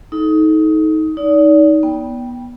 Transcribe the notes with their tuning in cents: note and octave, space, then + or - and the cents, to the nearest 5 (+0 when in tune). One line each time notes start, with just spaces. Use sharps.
D#4 +20 A4 -30
D#4 +10 D5 -35
B3 -20 G5 +0